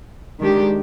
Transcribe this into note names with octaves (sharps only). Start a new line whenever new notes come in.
D#3 G#3 D4 G4